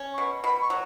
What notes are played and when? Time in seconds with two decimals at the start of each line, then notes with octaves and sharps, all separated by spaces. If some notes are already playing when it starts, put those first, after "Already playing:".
Already playing: C#4
0.13 C#6
0.18 B2
0.44 B2 B5
0.61 C#6
0.70 F#3